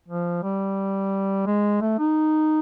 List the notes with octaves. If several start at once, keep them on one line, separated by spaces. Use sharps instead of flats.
F3
G3
G#3
A3
D#4